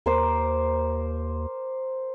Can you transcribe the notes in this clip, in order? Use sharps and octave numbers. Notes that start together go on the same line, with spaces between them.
D#2 A#4 C5 D6